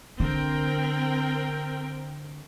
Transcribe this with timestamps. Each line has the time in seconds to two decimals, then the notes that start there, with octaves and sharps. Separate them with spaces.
0.20 D3 C4 A#4 G5